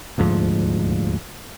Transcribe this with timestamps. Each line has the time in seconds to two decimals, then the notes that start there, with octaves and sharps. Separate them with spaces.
0.18 D#1 D2 G#2 F3